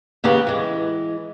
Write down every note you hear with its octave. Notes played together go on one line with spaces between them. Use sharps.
D#2 C#3 B3 G4 B4
E3 G#3